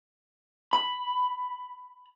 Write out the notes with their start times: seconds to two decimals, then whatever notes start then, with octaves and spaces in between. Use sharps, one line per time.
0.73 B5